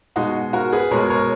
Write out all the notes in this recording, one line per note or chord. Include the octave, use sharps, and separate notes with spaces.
B2 G#3 D#4 F#4
F#4 A#4
G#4 B4
B2 G#3 A#4 C#5
A#4 C#5